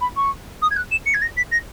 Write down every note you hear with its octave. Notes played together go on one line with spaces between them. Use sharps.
B5
C#6
D#6
G#6
F#6
E7
C#7
G#6
A#6
B6
A#6